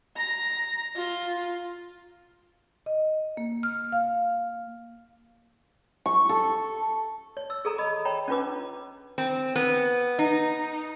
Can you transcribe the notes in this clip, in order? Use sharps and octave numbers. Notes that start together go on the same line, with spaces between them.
A#5
F4
D#5
A#3
F6
F5
C#6
A4
C#5
E6
G#4 A4 A#5
D#5 B5 D#6
C#5 G5 A#5 B5
C#4 D4 F4 B4 D6
C4
B3
D#4